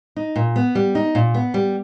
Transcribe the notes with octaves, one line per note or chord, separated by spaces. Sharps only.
D#4
A#2
B3
G3
D#4
A#2
B3
G3